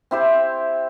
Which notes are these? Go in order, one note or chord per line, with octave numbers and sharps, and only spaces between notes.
C4 E4 G4 C5